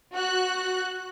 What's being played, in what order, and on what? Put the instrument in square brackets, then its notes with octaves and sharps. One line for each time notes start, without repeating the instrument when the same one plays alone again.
[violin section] F#4 F#6